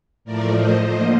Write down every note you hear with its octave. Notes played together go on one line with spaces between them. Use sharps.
A2 F3 A3 A#4 D5
C5 D#5
D3 F3 A#3 C5 D#5